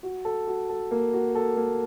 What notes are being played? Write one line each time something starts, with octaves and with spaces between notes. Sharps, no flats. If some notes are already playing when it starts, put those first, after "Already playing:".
F#4
A4
F#4
A4
A#3
F#4
A4
A#3